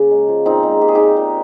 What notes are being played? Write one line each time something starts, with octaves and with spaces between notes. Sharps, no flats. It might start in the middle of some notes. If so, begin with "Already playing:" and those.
Already playing: C#3 A#3
G#3
F3
A#2 C4 D#4
G#3
A#2 G4
G#4
A#2 D#4 G4
A#2